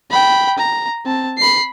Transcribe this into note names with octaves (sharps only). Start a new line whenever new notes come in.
G5 B5
A#5
C4 A5
B5 C7